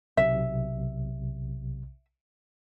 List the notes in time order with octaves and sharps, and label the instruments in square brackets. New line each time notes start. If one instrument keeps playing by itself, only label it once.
[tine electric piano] B1 C3 [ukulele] E5